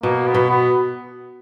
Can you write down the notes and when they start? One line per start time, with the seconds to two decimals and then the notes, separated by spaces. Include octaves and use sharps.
0.03 B2 A#3
0.27 B3
0.34 B2
0.50 B3